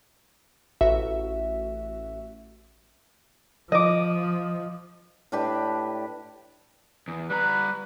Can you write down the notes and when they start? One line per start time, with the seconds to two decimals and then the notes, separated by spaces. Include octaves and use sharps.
0.81 A1 F#4 E5
3.72 F3 D#5 D6
5.32 A2 D4 G4 B4
7.08 E2
7.30 G3 B4 A#5